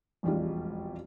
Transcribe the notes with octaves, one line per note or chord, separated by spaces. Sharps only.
E1 A1 F2 G3 G#3 F4